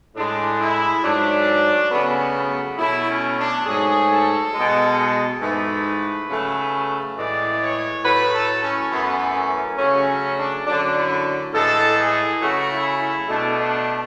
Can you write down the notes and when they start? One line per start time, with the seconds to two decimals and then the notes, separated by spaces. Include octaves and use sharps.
0.15 A2 G#3 D4
0.59 E4
1.03 G#2 F#3 A3 D4
1.91 C#3 F#3 A3 B3
2.35 B3
2.78 B2 F#3 A3 E4
3.08 C#4
3.37 D4
3.66 G#2 F#3 A3 G#4
4.09 A4
4.54 B2 G#3
5.41 G#2 E3 A3 B4
6.28 C#3 F#3 A3
7.16 A2 E3 G#3 D5
7.60 C#5
8.03 A2 F#3 A3 B4
8.33 A4
8.62 C#4
8.91 F#2 E3 A3 B3
9.35 C#4
9.78 C#3 F#3 A3 C#4
10.08 C#4
10.37 D4
10.66 F#2 D3 F#3 A3 D4
10.96 E4
11.53 A2 E3 G#3 A4
11.97 G#4
12.42 C#3 F#3 A3 F#4
12.71 E4
13.00 E4
13.29 B2 A3 D4
13.58 D4